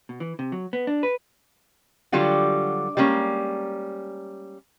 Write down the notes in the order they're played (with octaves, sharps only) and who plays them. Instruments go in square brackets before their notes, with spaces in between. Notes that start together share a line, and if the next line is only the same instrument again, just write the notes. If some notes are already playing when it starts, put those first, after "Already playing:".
[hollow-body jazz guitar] B2
E3
C3
F#3
B3
D4
B4
[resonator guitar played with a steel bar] D3 F#3 G3 F4 F#4
G3 G#3 A#3 C#4